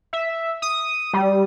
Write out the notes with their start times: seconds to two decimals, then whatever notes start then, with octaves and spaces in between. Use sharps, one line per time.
0.13 E5
0.62 D#6
1.13 G3